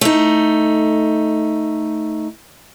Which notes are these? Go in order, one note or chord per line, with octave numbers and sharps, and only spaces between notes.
A3 D#4